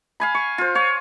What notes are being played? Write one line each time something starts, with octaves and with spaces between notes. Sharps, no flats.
F5 G#5 B5
C#6
F4 C5
F4 C#5